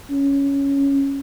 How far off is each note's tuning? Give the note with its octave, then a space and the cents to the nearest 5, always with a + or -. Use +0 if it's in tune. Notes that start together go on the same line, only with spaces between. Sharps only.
C#4 +5